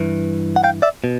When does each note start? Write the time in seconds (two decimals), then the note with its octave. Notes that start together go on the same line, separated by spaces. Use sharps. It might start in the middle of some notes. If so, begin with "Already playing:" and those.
Already playing: G2 E3
0.56 F#5
0.64 F5 G5
0.82 D5 E5
1.04 B2